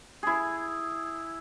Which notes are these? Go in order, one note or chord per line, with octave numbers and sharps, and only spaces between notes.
E4 G#4